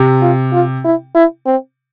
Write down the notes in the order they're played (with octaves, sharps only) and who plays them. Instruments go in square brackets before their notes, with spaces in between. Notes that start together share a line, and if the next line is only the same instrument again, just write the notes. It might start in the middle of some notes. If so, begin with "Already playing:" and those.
Already playing: [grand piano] C3
[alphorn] F4
F4
E4
E4
C4